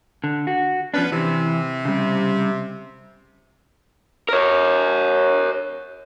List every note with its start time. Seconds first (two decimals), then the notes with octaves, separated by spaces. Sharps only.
0.24 D3
0.47 F#4
0.94 F3 B3 C#4 D4 B4
1.12 C3 E3
1.85 C#3 G3
4.29 A#4 C#5